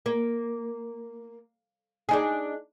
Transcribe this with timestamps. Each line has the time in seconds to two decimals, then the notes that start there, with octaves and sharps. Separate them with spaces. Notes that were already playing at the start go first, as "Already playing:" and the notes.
0.06 A#3
2.09 D4 D#4 G#4